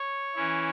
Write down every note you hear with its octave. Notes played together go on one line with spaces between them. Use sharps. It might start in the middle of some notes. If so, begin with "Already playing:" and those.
Already playing: C#5
E3 C#4 E4